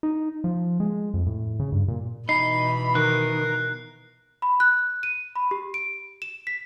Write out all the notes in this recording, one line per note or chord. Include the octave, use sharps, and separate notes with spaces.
D#4
F3
G#3
F2
A2
C#3
G2
A#2
B2 E3 D#4 B5 C7
D#3 A#4 F#6
B5
F#6
D#7
B5
G4
D7
E7
B6